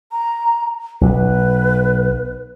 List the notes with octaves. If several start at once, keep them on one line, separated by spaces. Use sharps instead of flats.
A#5
B1 B4